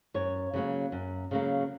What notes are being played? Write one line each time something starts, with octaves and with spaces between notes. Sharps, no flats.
F#2 C#5
C#3 F#3 A#3
F#2
C#3 F#3 A#3